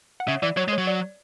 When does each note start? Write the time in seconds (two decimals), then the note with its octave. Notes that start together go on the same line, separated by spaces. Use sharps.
0.20 F#5
0.28 C#3 E5
0.42 E3 D5
0.57 F#3 C#5
0.68 G#3
0.73 C#5
0.78 F#3
0.87 D5